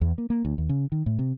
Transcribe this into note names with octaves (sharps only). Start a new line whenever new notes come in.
E2
A#3
A#3
D2
D#2
C#3
D#3
A2
C3